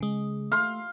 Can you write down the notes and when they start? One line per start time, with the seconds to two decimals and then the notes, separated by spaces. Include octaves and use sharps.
0.01 C#3 G#3
0.52 A3 F5 C6